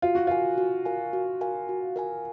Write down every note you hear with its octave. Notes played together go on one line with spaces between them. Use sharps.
F4 F#4
F#4
F4 A#4 F5 G#5
F#4
A#4 F5 G#5
F#4
A#4 F5 G#5
F#4
A#4 F5 G#5